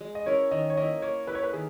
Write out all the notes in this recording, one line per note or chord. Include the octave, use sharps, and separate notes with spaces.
G#3
D#5
C#4 E4 A#4 C#5
D#3 D#5
C#5
A#3 E4 D#5
A#3 C#5
E4 G4 B4
C#5
B4
D#3 G#4